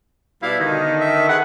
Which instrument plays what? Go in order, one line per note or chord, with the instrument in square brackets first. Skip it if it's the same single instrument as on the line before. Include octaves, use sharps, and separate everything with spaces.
[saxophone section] B2 G3 F5 [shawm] E4
[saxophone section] D3 D#3 [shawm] D#4
[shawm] E5
[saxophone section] G#4 F#5 [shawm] B4